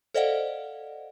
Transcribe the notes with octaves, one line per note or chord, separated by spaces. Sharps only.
A4 C5 D5 D#5 F5 F#5